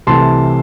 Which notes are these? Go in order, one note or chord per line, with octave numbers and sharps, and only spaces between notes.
C2 C3 E3 A3 A5 C6